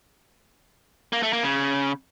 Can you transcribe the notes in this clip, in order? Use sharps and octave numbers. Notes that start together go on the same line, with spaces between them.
A#3
A3
A#3
C#3